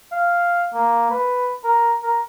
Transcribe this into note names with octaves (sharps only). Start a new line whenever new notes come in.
F5
A#3
B4
A#4
A#4